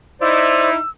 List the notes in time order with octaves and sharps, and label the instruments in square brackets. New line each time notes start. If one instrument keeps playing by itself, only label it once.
[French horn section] D#4 E4 [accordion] C5 D5 [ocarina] E6